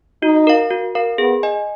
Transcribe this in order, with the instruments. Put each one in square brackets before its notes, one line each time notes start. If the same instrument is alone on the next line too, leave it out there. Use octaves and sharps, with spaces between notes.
[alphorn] D#4 [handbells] F#4
[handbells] A#4 F5
F#4
A#4 F5
[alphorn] B3 [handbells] G#4
[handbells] D#5 G#5